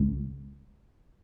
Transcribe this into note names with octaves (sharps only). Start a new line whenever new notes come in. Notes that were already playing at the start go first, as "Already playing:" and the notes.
Already playing: C#2